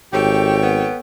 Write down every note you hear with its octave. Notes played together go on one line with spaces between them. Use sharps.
G#1 G4 A4 C#5 G5
B3